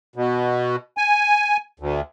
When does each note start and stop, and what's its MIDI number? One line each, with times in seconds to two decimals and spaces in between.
0.16 0.76 47
0.97 1.57 80
1.80 2.01 38